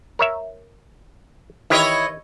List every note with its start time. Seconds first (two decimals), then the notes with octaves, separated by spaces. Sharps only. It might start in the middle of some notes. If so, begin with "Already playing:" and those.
0.19 A#4 C#5 E5
1.70 D#3 E3 E4 G4 C#5 D#5